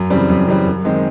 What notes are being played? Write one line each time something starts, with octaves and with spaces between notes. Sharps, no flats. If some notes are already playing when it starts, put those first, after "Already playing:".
Already playing: F#2
C#3 E3 G3 C4
F#2
C#3 E3 G3 C4
F#2
D#3 G#3 C4